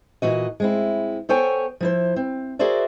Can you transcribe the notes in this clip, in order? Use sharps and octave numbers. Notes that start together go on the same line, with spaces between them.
A#2 E3 F#4 D#5
G#3 C4 E4
B3 A4 C5 C#5 G5 G#5
F3 E4 C5
C4
F#4 G#4 A#4 C5 D5 E5